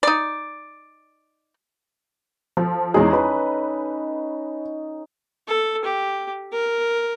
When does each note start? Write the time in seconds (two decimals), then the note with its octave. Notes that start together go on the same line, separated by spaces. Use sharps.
0.03 D#4 D5
2.57 F3 A4
2.94 E2 G#3 C#4 D#4 G#4
3.13 B4
5.48 A4
5.85 G4
6.53 A#4